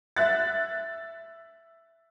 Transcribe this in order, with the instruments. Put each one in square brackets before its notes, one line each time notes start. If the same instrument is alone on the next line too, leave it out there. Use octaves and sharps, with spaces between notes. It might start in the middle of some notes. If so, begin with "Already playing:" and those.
[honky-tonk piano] E5 F#6 A6